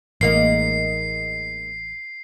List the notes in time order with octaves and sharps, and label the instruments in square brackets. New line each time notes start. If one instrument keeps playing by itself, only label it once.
[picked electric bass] A1 [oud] G#3 A#3 D#4 [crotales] C7